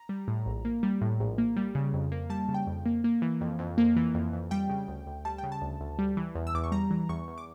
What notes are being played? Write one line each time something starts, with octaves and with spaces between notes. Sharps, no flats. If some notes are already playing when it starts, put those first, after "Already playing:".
Already playing: A#5
G3
A2
A#1
A#3
G3
A2
A#1
A#3
G3
C#3
F2
A#3
G3 A5
C#3
G5
F2
A#3
A#3
E3
F2
F2
A#3
E3
F2
F2
G3 G5
C#3
D2
D2
G3 A5
C#3 G5
A5
D2
D2
G3
E3
E2
E6
E2 D6
C#6
G3 A#5
E3
E2 C#6
E2
D6